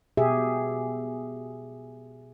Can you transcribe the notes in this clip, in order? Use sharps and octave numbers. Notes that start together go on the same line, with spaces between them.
B2 G4 G#4 E5